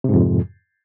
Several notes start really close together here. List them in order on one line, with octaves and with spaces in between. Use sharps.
C3 G#2 F2